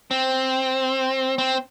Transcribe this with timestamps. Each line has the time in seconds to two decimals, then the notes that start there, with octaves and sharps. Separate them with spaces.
0.11 C4
1.38 C4